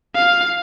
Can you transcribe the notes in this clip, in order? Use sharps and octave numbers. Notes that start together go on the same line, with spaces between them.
F5